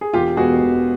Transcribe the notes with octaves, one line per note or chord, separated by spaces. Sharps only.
G#4
E1 F4 G4
E2 B2 G#3 B3 F#4 G#4
E1